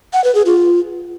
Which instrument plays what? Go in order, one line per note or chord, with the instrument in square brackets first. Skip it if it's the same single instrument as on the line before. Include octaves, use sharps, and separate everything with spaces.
[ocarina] F#5
B4
G#4
F4